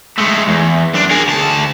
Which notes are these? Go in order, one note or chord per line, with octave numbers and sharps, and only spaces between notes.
G#3 A3
E2
F#2 D4
G#4 A#4
D2 A5